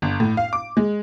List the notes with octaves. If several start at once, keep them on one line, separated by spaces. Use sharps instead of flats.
G1
A2
F5
D6
G#3